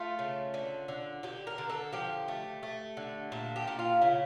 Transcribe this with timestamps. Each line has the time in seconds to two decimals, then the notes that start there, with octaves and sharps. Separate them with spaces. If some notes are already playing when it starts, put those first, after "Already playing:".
Already playing: A3 F4
0.19 C#3
0.54 D3
0.88 D3
1.23 D3 G4
1.47 A#4
1.58 D3
1.70 A4
1.93 F3 G4
2.28 A3
2.63 A3
2.97 D3
3.32 A#2 A4
3.56 G4
3.67 A#2
3.79 F4
4.01 C#3 E4